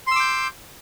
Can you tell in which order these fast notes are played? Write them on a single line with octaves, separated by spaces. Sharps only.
C6 E6 D6 G6